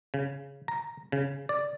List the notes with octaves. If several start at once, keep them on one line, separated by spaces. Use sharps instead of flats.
C#3
A#5
C#3
D5